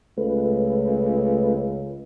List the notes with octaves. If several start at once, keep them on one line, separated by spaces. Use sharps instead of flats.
C#2 A3 B4